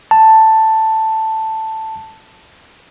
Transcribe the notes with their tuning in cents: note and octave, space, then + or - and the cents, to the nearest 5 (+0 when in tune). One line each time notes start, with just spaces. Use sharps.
A5 +5